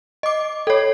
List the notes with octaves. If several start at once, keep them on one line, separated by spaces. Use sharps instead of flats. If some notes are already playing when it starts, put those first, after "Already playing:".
D#5 D6
A4 C#5